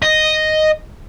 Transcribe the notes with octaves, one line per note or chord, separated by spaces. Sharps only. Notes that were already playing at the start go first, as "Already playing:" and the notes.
D#5